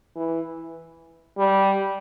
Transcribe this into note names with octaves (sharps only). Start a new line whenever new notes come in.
E3
G3